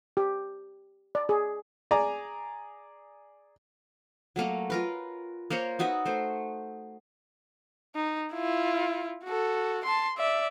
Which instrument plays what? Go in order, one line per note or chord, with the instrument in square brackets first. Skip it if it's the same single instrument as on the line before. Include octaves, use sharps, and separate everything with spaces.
[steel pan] G4
D5
G#4
[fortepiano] G#4 D5 G#5 A#5
[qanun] F#3 A3 A#3 C#4
F4 A#4 B4
A#3 A#4 C5 C#5
D#4 F#4 B4 E5
A3 C5
[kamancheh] D#4
E4 F4
F#4 A4
A5 C6
D5 E5